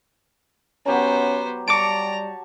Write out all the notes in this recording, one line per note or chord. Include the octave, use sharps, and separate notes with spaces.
F#3 B3 C#4 G4 C5 A#5
G3 A5 A#5 C#6 D6 D7